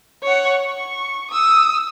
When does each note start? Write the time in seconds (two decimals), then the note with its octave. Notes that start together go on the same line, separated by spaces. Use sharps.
0.23 C#5 F#5
0.63 C#6
1.31 D#6 E6